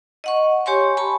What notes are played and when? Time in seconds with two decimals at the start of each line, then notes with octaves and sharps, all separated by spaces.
0.24 D#5 F#5 C#6
0.66 G4 C#5 G#5 C6 C#6
0.97 G#5 A5 B5 C#6